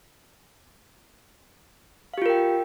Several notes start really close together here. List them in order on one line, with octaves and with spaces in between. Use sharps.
F5 G4 F4 A#4 G5